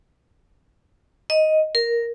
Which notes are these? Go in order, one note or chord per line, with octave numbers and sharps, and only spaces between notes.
D#5
A#4